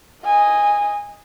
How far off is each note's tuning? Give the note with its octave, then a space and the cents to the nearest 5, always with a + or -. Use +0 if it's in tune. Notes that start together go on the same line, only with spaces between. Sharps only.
D#5 +5 G#5 -15